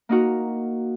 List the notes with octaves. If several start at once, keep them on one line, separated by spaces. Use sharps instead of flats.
A#3 D#4 F#4 A#4